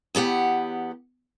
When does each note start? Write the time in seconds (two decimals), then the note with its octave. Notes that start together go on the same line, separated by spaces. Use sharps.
0.15 E2 B3 G4 F#5